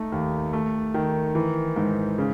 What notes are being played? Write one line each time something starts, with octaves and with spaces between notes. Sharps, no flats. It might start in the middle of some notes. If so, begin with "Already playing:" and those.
Already playing: A3 D#4
D#2
A3
D#3
E3
G#2
C#3